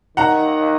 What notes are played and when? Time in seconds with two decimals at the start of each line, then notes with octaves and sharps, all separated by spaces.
0.17 D#3 F#5 A#5